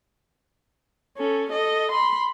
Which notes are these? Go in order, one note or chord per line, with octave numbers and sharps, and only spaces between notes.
C#4 A4
A4 D#5
B5 C6